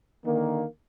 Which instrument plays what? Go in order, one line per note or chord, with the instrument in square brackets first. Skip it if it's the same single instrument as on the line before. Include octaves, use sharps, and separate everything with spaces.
[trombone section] D3 D#3 A#3